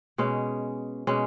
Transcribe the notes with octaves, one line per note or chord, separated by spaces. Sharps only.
B2 G#3 C#4
B2 G#3 C#4